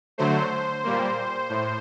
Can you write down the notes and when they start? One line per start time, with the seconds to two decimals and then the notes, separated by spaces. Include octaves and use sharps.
0.18 D3 F#3 A3 C5
0.84 A#2 G3 A#3
1.50 A2